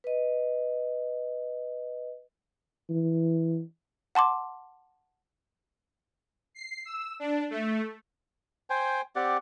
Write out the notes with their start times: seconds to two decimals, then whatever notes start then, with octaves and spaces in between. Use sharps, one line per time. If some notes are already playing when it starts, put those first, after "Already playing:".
0.04 B4 D#5
2.90 E3
4.15 F#5 A5 C6 D6
6.55 C7
6.85 E6
7.20 D4
7.51 A3
8.70 C5 G5 G#5
9.16 C4 G4 D5 F#5